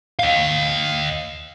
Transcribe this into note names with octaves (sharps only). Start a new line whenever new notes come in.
D#5 F5